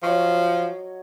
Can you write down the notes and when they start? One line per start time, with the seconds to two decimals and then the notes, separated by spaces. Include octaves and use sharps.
0.03 F3 F#3 D#5 C#6